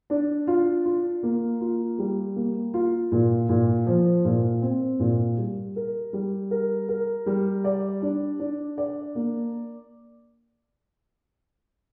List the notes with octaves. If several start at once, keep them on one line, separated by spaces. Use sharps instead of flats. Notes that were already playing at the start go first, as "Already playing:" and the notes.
D4
F4
F4
A#3
F4
G3
A#3
F4
A#2
A#2
F3
A#2
C4
A#2
G3
A#4
G3
A#4
A#4
G3
D5
D4
D4
D5
A#3